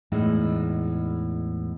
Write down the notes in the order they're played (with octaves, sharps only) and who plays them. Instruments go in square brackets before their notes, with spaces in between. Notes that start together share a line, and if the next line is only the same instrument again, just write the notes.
[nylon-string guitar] E2 A2 G#3 D#4 E4